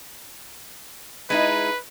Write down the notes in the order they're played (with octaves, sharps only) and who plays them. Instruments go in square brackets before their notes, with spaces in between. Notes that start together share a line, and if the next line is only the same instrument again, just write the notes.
[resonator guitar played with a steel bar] G#3 D#4 E4 [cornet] B4